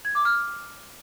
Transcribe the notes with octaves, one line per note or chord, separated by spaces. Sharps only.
G#6
D6
F6